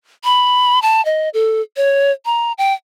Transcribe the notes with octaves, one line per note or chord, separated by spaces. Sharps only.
B5
A5
D#5
A4
C#5
A#5
G5